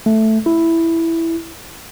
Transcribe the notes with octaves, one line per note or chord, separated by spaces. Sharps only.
A3
E4